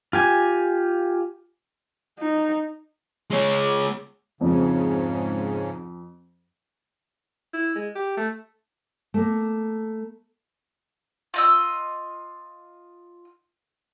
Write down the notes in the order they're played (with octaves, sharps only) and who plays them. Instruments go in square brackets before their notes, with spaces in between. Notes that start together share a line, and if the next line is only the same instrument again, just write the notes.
[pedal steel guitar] F4 G4 G#5
[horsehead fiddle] D#4
[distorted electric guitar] G#3 C#5
[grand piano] F2 [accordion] G#2 C#3
[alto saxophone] E4
G#3
G4
A3
[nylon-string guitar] A3 A#3
[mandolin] F4 D#5 E6